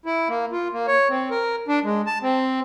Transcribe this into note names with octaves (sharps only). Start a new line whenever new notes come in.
E4
A#3
F4
A#3
C#5
C4
A#4
D4
G#3
A5
C4